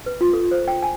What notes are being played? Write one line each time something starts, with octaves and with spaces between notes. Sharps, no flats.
B4
F4
A4
C5
G5
G#5